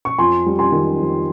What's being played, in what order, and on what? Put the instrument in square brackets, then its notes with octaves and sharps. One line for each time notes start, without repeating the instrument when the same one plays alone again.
[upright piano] C#6
F2 G#5 C6
G3
G#5 C6
D#3
F2